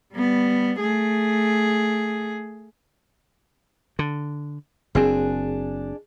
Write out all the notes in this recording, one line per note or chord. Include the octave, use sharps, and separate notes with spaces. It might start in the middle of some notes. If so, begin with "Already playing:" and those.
G3 B3
A3 G#4
D3
F#1 C4 D4 G#4